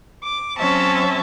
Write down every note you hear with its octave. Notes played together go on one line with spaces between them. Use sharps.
D6
F#3 C4 C#4 E5 A5